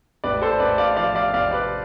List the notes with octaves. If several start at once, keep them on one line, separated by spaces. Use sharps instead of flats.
A1 B4 D5
A4 C5
A1 B4 D5
D5 F5
F3 D5 F5
D5 F5
A1 D5 F5
B4 D5